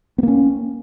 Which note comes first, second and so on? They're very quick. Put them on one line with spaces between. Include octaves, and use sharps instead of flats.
B3 A#3 C#4